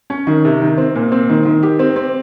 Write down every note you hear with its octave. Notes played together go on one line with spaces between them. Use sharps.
C#4
D#3
C3
D#3
C4
A#2
C4
D#3
D#3
G4
C4
C4